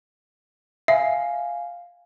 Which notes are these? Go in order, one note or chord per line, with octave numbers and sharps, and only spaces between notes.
E5 F5 G#5